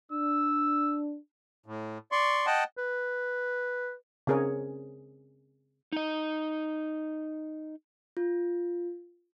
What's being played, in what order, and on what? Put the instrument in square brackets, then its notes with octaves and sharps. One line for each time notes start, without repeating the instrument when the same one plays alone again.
[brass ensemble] D4 [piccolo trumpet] E6
[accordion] A2
D5 C6 C#6
D#5 F#5 G5 A5
[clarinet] B4
[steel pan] C#3 C4 G#4 A#4 C#5
[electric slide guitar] D#4 D#5
[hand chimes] F4